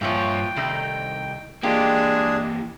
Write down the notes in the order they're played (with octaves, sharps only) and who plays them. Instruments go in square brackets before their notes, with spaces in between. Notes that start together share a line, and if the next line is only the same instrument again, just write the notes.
[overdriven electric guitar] G2 C#5 [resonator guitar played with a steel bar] A#2 E3 F3 [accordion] G5
[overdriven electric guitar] C2 [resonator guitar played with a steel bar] D#3 A3 D#4
[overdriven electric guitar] E3 A#3 [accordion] G#3 D4 G#4 [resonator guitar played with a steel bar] F4 G4